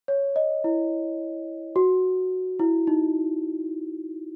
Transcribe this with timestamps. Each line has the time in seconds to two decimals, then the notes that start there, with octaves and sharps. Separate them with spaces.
0.08 C#5
0.36 D#5
0.64 E4
1.76 F#4
2.59 E4
2.87 D#4